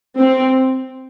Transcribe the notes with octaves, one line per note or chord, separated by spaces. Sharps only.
C4